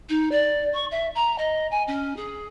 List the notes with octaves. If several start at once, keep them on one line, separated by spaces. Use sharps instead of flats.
D#4
D5
C#6
E5
A#5
D#5
G#5
C#4
G#4